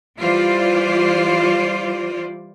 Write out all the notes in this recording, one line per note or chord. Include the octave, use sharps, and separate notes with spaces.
E3 G3 F4 C5 D5